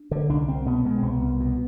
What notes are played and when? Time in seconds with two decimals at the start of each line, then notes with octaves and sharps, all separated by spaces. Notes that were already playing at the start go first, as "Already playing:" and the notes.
Already playing: D4
0.11 D3
0.29 C2 D4
0.48 C2 C4
0.66 B2 B3
0.85 B2 G#3
0.98 C4
1.03 C2 B3
1.21 C2
1.40 B2